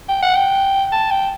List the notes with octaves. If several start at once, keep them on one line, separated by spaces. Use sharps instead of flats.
G5
F#5
G5
A5
G5